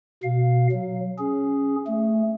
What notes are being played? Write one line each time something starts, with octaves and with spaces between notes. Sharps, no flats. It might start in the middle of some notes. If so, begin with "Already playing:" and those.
B2 F5
F#3
C#4 G#4
A3